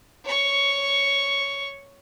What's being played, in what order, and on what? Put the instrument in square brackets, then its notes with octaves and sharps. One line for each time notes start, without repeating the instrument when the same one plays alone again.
[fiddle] C#5 C#6